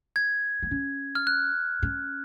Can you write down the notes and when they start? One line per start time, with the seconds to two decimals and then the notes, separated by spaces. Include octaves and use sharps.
0.16 G#6
0.63 B3
0.71 C#4
1.15 F6
1.27 F#6
1.83 C#4